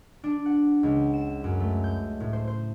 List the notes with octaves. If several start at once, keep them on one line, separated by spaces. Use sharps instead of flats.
D4
F#5
C#2
E7
F#2
A3
G6
A2
C5
C5